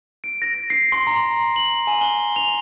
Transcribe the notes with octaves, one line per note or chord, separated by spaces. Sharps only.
D7
A#6
C7
C6
A#5
F#7
G#5
G7
F7